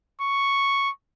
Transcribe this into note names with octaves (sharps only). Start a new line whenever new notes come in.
C#6